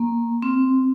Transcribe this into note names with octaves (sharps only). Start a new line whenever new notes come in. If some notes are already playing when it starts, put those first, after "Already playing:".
Already playing: A#3
C4